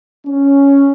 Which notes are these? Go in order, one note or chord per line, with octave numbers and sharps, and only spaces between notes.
C#4